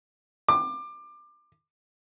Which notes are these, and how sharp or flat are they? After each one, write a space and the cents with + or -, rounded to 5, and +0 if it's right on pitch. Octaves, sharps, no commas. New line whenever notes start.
D6 +25